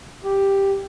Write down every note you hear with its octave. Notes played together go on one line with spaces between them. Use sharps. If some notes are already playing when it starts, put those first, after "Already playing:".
G4